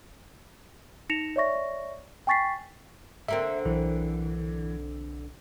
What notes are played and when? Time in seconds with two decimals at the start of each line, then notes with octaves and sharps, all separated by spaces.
1.10 D#4 A#6 C#7 E7 F7
1.36 C#5 D5 E5 C#6 A#6
2.27 G5 G#5 C#6 A6 B6 C7
3.28 D3 A#3 C4 E5
3.65 B1 E3